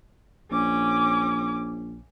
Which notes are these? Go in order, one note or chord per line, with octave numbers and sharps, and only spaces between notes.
A#1 C#4 D6